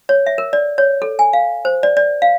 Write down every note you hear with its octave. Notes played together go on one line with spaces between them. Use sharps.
C#5
E5
A#4
D5
C#5
A4
G#5
F5
C5
D5
D5
F5